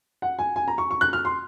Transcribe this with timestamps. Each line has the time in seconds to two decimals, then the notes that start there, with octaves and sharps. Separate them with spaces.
0.22 F#5
0.39 G#5
0.56 G#5
0.68 A#5
0.78 C#6
0.91 C#6
1.01 F#6
1.13 F6
1.25 C6